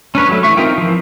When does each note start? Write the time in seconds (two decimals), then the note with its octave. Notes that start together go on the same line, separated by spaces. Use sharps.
0.15 C#4 D4 B4 C#5
0.29 F#3 A3
0.43 E3 E5 C#6
0.57 C4 D#4 F4 A#4 G5
0.78 E3 F3